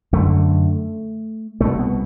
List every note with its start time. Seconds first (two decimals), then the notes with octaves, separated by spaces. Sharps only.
0.13 F#2 D3 A3
1.60 C2 B2 A3
1.79 B3